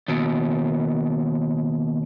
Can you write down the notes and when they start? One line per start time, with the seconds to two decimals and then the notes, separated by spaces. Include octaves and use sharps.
0.08 D#2 B2